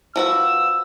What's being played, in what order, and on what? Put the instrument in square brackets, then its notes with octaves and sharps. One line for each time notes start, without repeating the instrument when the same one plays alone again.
[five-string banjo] F3 F#4 B4 [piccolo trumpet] E6